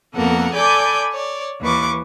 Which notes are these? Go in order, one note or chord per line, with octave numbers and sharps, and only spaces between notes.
F2 A#3 B3 A4 A#4 F#5
A4 D5 G#5 B5 D6 G6
C#5 D5
D#2 D#3 E3 B4 C#6 D6